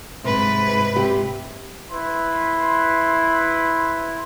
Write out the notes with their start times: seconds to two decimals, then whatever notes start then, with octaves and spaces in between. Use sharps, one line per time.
0.24 G#2 C3 B4
0.96 C3 G4
1.91 E4 B4 C6